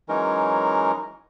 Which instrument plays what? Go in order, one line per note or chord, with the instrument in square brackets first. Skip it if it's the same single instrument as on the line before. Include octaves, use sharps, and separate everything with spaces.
[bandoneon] E3 F#3 G#3 C#4 D#4 A#4